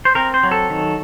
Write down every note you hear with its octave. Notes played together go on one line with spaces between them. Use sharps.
C5
C4 A#4
C5
F#3
A4
D#3